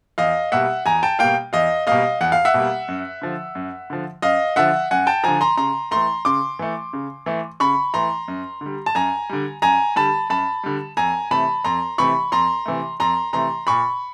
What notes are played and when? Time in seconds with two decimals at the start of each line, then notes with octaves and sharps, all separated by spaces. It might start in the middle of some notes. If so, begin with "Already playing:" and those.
0.18 E2 D#5 F5
0.52 B2 G3 A#3 E5 F#5
0.86 E2 G#5 A#5
1.03 G5 A5
1.19 B2 G3 A#3 F5 G5
1.53 E2 D#5 F5
1.87 B2 G3 A#3 D#5 F5
2.21 E2 F#5
2.32 F5
2.45 E5 F#5
2.54 B2 G3 A#3
2.88 F#2
3.22 D3 F3
3.55 F#2
3.90 D3 F3
4.22 F#2 D#5 F5
4.56 D3 F3 E5 F#5
4.91 F#2 F#5 G#5
5.07 G5 A5
5.24 D3 F3 G#5 A#5
5.41 A#5 C6
5.57 C#3 A#5 C6
5.91 E3 A3 A#5 C6
6.25 C#3 C6 D6
6.59 E3 A3
6.93 C#3
7.26 E3 A3
7.60 C#3 B5 C#6
7.94 E3 A3 A#5 C6
8.28 F#2
8.61 D3 G3
8.86 A5
8.95 F#2 G#5 A#5
9.29 D3 G3
9.62 F#2 G#5 A#5
9.96 D3 G3 A5 B5
10.30 F#2 A5 B5
10.63 D3 G3
10.97 F2 G#5 A#5
11.31 C3 E3 A3 A5 B5
11.64 F2 A#5 C6
11.98 C3 E3 A3 B5 C#6
12.32 F2 A#5 C6
12.65 C3 E3 A3
13.00 F2 A#5 C6
13.33 C3 E3 A3 A#5 C6
13.67 A#2 B5 C#6